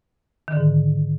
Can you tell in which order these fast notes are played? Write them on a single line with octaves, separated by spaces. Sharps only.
D#3 D3 G#2